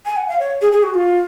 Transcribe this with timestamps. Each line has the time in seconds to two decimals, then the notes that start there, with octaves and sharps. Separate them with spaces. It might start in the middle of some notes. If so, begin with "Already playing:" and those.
0.06 G#5
0.17 F#5
0.28 F5
0.39 C#5
0.61 G#4
0.72 G#4
0.83 F#4
0.94 F4